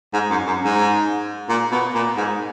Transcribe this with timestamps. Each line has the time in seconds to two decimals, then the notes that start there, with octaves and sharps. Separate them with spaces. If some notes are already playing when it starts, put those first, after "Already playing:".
0.13 G#2
0.30 F#2
0.47 F#2
0.65 G#2
1.49 A#2
1.72 B2
1.95 A#2
2.17 G#2